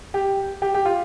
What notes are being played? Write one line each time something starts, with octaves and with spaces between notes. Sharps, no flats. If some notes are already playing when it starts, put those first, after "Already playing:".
G4
G4
G4
F4